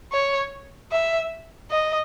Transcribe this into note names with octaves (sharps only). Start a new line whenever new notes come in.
C#5
E5
D#5